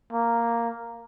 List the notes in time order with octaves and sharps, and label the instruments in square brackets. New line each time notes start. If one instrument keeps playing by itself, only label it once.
[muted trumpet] A#3